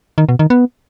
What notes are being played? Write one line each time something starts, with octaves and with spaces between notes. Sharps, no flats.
D#3
B2
D#3
B3